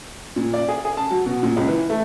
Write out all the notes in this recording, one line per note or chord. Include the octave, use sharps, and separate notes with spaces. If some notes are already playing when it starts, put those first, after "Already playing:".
A#2
D5
G#4
G#4
A5
F#3
B2
A#2
C#2
E3
A3